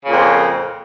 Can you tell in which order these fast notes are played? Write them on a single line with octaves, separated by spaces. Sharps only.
C#3 A#2 F2